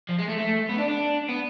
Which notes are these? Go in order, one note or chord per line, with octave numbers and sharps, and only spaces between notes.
F3
G#3
A3
A3
B3
D4
D4
B3